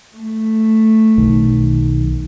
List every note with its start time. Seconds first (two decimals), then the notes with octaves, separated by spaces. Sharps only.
0.17 A3
1.18 B1 D#3